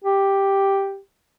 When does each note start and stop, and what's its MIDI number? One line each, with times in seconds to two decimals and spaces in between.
0.04 0.99 67